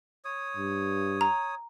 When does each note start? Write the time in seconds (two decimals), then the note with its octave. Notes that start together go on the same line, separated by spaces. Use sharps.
0.25 C#5 D#6
0.57 G2
1.21 A#5